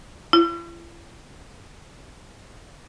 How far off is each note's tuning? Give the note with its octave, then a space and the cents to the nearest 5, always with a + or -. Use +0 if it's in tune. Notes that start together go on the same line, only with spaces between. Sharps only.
E4 +45